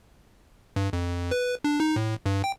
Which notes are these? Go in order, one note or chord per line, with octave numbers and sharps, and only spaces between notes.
G2
F2
B4
D4
D#4
A2
G2
G5